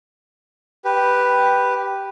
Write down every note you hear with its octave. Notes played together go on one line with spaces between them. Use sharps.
G4 B4